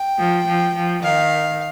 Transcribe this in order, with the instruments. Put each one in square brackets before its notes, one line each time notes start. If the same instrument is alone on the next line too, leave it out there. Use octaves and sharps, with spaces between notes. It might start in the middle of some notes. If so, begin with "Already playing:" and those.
Already playing: [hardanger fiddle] G5
[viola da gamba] F3
F3
F3
[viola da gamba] D#3 [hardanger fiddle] F5